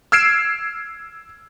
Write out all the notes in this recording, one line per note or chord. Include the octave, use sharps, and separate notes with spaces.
E6 F6 G#6 C7 D7 E7